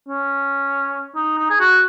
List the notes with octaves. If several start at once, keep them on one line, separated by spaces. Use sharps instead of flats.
C#4
D#4
D#4
G#4
F#4